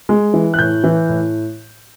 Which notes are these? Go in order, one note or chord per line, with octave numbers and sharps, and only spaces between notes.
G#3
E3
F#6
A2 G6
E3
A2